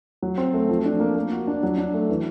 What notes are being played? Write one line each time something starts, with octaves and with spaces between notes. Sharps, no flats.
F#3
C4
A3
F3
D4
A#3
A#3
F#4
D4
F#3
D4
A3
E3